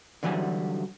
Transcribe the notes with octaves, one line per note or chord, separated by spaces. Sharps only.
D3 E3 F#3 G3 G#5